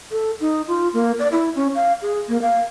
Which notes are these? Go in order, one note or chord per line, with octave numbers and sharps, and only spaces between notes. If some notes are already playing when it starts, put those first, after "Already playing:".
A4
D#4
F4
A#3
D5
E4
C#4
F5
G#4
A#3
F5